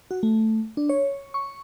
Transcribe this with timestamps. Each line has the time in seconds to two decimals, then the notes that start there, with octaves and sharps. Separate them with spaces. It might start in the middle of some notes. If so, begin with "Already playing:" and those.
0.11 F#4
0.23 A3
0.77 D4
0.89 C#5
1.34 C#6